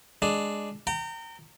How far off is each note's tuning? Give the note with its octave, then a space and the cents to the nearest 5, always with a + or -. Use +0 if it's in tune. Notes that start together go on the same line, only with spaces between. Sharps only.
G#3 +0 D4 +0
G5 -25 A#5 -30